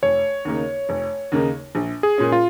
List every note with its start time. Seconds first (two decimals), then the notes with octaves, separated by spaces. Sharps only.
0.02 F1 C#5
0.45 D#2 C#3 A#3 D#4
0.89 F1
1.32 D#2 C#3 A#3 D#4
1.75 A#1
2.03 G#4
2.18 A#2 G#3 C#4
2.32 F4